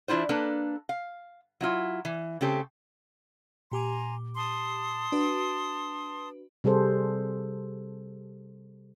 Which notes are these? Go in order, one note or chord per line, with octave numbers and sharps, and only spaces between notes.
E3 D4 E4 F4 C5
A#3 D4 A4 B4
F5
F#3 E4 F4
E3
C#3 A3 C4 G4 A4
A#2 G4 G#5 A#5 C6 D6
A5 C6 D#6
D4 F#4 B4
C3 G3 G#4 A4 C5